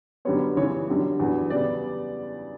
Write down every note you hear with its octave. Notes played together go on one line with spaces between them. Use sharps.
F#2 D3 G3 B3 C#5
C#3 E3 G3 C#5
F#2 D3 G3
E2 D3 F#3 B3
C#3 G3 B3 D5